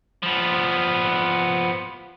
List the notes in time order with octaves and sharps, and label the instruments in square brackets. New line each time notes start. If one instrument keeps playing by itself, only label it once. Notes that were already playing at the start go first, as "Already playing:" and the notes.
[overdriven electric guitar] F3 B3